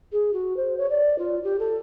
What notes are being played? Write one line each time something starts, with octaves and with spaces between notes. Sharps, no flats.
G#4
F#4
C5
C#5
D5
F4
G4
A4